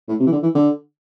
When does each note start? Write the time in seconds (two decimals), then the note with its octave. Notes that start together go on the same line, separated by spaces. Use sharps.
0.08 A2
0.20 C3
0.26 E3
0.32 D3
0.43 E3
0.55 D3